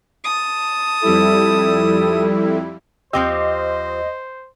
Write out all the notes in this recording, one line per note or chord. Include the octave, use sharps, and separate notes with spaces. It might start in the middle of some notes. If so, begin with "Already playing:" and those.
A5 D#6
F2 G3 E4 A4
D#2 F3 C4 G4 C5 D#5 E6